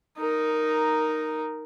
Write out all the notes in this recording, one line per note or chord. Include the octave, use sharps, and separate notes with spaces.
D#4 A#4